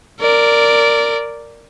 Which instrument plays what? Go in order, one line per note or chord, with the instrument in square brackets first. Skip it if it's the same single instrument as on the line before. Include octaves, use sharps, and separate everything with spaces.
[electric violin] A#4 D5